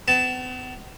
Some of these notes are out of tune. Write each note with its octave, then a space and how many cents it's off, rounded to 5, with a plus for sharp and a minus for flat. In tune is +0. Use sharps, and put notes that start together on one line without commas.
B3 +40 A5 +0